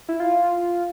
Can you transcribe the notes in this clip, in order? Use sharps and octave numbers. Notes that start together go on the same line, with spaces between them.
E4
F4